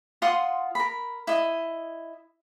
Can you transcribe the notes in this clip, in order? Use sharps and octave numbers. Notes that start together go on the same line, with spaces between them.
F4 F#5 C6 D#6
A#4 B5
E4 D#5